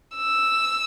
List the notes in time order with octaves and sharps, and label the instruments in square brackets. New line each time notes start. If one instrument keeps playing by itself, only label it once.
[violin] E6